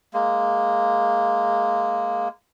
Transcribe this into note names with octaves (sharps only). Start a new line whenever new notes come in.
G#3 A#3